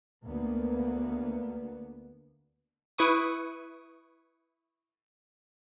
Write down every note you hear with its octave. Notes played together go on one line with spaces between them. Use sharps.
D2 A#3 B3
E4 B4 C#6 D#6